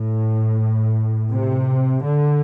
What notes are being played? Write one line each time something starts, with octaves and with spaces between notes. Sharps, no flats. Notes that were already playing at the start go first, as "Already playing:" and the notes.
Already playing: A2
C3
D3